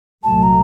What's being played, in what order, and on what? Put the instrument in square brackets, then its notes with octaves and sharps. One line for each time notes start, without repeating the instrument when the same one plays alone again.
[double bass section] C2 A#2 F#3 A3 [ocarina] A5
[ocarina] A#5